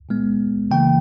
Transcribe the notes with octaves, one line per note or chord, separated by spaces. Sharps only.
A#2 G#3 B3
C#3 E3 A#3 G5